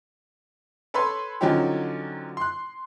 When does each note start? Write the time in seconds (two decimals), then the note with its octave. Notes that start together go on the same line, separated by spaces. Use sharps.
0.94 A4 B4 C#5 B5 C6
1.41 D3 F3 F#3 C#4 D#4 G4
2.37 C6 F#6